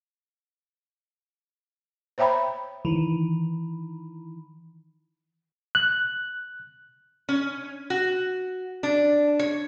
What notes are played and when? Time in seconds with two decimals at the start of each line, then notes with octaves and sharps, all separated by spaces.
2.18 C5 C#5 E5 G5 A#5 B5
2.85 D#3 E3
5.75 F#6
7.29 C#4
7.90 F#4
8.83 D4
9.39 C#5